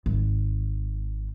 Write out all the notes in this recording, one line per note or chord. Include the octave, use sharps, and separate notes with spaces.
G#1